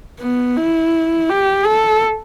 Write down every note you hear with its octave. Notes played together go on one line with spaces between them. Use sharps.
B3
E4
G4
A4